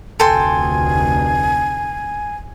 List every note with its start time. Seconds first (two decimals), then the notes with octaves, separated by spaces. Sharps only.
0.20 F1 D2 A4 G5 G#5 C6